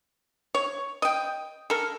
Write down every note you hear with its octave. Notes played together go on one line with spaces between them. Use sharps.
C#5
D#5 G5
A4 A#4